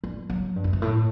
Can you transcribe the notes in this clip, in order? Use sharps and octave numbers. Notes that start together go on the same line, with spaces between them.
G3
F#3
G2
F#2
G2
A2